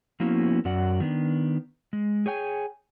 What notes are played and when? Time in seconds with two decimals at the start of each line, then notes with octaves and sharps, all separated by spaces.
0.20 F3 A#3 B3 C#4 E4 F#4
0.65 F#2 F#4 D5 F#5
1.00 D#3 B3 D4
1.93 G#3
2.26 G#4 C#5 G5 G#5